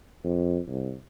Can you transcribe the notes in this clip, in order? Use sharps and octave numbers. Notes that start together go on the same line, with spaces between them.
F2
C2